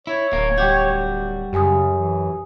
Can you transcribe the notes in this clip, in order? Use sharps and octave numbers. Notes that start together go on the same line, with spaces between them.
E4 C#5
D1 A#3
G3 F#4 G5 D6 G6
F#2 C#3 G4 G#5 D#6
E3